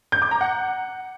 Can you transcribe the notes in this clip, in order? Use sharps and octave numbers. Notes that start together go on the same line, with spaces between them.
G6
D6
A#5
F#5